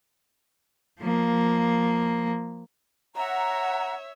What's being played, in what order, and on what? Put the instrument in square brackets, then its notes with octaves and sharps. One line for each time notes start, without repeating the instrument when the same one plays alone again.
[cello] F3 A#3
[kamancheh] C#5 E5 [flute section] F#5 A#5